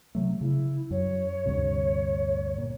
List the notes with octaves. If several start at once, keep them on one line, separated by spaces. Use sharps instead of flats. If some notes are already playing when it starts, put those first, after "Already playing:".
C3 F#3 A3
C#3 E4
F#2 C#5
D2 G2 C3
A#2